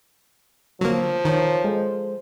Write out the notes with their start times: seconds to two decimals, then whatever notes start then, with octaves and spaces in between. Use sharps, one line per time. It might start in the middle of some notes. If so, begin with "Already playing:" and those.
0.81 D3 F3 F#3 A#3
1.25 D#3 A#4 C#5
1.64 G#3 A4 C5